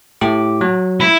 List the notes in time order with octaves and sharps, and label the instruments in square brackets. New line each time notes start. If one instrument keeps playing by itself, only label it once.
[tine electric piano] A2 G4 D6
F#3
[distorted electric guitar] E4